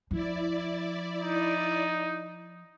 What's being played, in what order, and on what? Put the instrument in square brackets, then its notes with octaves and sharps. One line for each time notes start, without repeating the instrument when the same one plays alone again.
[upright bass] F3 [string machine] E4 D5
[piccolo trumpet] D#4